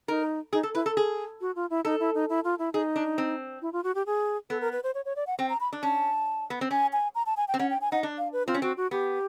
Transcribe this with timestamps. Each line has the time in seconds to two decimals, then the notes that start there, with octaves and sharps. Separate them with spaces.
0.08 D#4 A#4
0.53 D#4 G#4
0.63 A4
0.75 E4 B4
0.86 A4
0.97 G#4
1.41 F#4
1.56 F4
1.70 E4
1.85 D#4 A4
2.00 E4
2.15 D#4
2.30 E4
2.44 F4
2.59 E4
2.73 D#4 G#4
2.96 D4
3.18 C4
3.62 E4
3.73 F4
3.84 F#4
3.95 G4
4.06 G#4
4.50 B3 A4
4.61 A#4
4.72 B4
4.84 C5
4.95 C#5
5.05 C#5
5.16 D5
5.27 F#5
5.39 C4 G5
5.49 A#5
5.60 B5
5.73 D4
5.83 C#4 A5
6.50 B3
6.61 C4
6.71 C#4 G#5
6.93 G#5
7.15 A#5
7.26 A5
7.37 G#5
7.48 G5
7.54 C4
7.59 C#4 F#5
7.70 G5
7.81 G#5
7.92 D#4 F#5
8.03 D4
8.18 F5
8.33 B4
8.47 C4 F4
8.54 C#4
8.62 C4 F#4
8.77 F#4
8.91 B3 G4